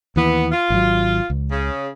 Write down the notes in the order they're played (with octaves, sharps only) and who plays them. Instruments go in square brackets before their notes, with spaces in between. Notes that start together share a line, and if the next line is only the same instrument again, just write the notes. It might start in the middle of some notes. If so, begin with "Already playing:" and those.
[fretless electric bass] D#2 E3 [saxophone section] B3
[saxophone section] F4
[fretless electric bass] G#1 F#3
C#2
[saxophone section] C#3